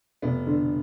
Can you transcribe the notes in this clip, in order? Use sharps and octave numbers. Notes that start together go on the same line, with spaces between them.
F1 B3
D3